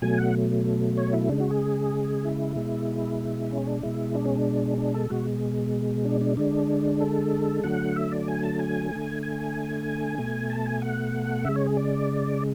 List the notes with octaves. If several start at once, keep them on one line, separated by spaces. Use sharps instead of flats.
B2 F#3 A3 G#5
F#5
C#5
E4
C#3 G#3 D4
F#4
G#4
E4
B2 G#3
C#4
D4
B2 G#3 E4
D4
C#4
D4
D4
A4
B2 G#3 F#4
D4
D4
D3 G#3 D4
A4
D3 F#3 A3 F#5
E5
D5
G#5
A5
G#5
D3 A3
G#5
B2 A3
A5
G#5
F#5
C#3 G#3 E5
C#5
G#4
D5